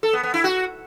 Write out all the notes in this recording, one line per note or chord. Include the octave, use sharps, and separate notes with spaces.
A4
B3
B3
E4
F#4